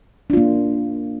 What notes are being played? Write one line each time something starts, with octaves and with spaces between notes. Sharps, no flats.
A#3 D4 F4